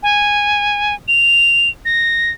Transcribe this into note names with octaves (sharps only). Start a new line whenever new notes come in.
G#5
F7
A#6